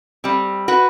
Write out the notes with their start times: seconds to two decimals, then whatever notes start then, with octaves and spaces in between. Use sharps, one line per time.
0.24 G3 C4
0.68 F#4 B4